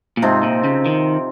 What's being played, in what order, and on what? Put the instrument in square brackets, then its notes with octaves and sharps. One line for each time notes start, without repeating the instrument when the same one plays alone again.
[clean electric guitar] A#2
[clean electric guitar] G#2 [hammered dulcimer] C3 F3 C4 D#4
[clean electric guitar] A#2
C#3
D#3